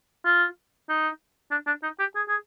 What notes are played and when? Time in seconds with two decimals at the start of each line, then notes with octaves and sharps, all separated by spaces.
0.25 F4
0.89 D#4
1.51 D4
1.67 D4
1.83 D#4
1.99 G4
2.15 G#4
2.28 G#4